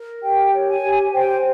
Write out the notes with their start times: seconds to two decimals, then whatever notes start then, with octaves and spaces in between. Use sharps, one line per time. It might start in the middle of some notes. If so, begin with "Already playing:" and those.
Already playing: A#4
0.22 G4 G5
0.53 C#5
0.67 G#5
0.82 G4
1.13 C5 G5